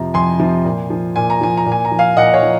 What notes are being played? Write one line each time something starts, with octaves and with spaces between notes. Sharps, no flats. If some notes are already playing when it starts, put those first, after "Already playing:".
Already playing: F2 C3 F3 A#5
F2 G#5 C6
C3 F3
A#2
F3
A#2 G#5
A#5
F3 G#5
A#5
A#2
G#5
A#5
F3
F5 G#5
A#2 D#5 F#5
C#5 F5
F3